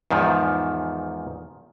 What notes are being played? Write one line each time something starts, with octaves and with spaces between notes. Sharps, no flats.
E2 G#2 D#3 F3